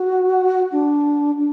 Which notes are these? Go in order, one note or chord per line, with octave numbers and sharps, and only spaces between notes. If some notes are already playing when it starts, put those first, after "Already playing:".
Already playing: F#4
D4
D4